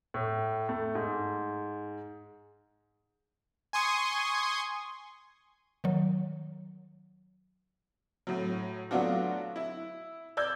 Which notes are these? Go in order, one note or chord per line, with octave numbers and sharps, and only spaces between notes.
A2
A3
G#2
G#5 C6 C#6 D#6
D#3 F#3
A2 F#3
F#3 A3 B3 D4 F4 F#4
E4
D5 E6 G6 G#6